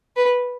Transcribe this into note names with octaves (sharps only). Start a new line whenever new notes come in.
B4